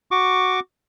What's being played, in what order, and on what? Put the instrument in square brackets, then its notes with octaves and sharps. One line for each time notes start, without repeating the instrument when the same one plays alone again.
[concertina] F#4 C#6 D6